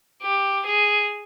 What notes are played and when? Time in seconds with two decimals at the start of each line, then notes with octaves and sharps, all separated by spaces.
0.22 G4
0.65 G#4